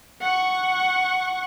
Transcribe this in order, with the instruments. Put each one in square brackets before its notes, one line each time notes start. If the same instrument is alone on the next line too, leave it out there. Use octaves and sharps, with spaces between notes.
[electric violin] F#5 C#6